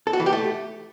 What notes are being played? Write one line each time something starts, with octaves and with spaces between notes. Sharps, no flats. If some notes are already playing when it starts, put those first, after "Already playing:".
A4
F#4
E3
G4
A3